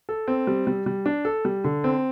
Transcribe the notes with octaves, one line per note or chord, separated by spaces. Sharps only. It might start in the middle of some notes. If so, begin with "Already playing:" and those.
A4
C4
G3
G3
G3
D4
A4
G3
D3
C4